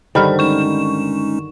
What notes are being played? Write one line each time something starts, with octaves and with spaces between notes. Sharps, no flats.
G2 D3 D#3 C5 B5 F6
G#3 C#4 D#4 C#6 E7